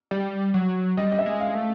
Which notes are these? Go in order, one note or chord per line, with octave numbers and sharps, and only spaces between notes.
G3
F#3
G3 D#5
D#5
E5
G#3
F5
A3